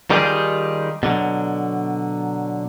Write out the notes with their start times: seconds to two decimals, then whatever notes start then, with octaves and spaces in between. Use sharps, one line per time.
0.10 D#3 G3 D#4 F4 G4 G#4
1.03 B2 D3 F#3